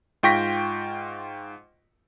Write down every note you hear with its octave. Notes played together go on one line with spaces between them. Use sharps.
G#2 F4 G5 C#6 A#6 B6